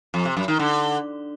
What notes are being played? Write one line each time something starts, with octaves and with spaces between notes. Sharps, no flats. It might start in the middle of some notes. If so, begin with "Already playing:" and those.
F2
C3
F#2
D#3
D3